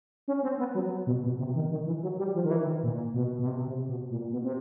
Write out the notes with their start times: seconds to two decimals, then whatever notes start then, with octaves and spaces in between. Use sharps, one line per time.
0.28 C#4
0.43 C4
0.59 B3
0.74 F#3
1.07 B2
1.24 B2
1.39 C3
1.55 D#3
1.71 D#3
1.86 E3
2.03 F#3
2.18 G3
2.35 F3
2.44 D#3
2.51 E3
2.67 D#3
2.83 A#2
3.14 B2
3.39 B2
3.47 C3
3.67 C3
3.89 B2
4.10 A#2
4.31 B2
4.43 C3